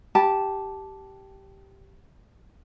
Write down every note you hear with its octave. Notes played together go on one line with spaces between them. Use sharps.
G4 A5